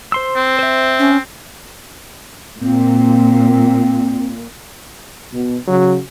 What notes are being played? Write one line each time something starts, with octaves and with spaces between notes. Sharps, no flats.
C5 C6 E6
C4
C5 E5
C#4
A#2 C4
B2
C#3 F#3 F#4